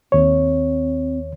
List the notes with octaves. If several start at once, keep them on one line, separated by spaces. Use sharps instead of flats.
D#2 C4 C#5